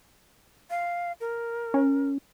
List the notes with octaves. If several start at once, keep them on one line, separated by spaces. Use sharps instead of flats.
F5
A#4
C#4